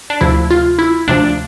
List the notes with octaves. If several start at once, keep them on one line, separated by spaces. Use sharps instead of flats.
D4
D2 C3 F3 E4
F4
E4
D2 C3 F3 D4